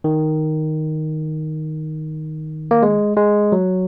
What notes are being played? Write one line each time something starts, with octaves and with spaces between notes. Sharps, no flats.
D#3
A#3
G#3
G#3
F#3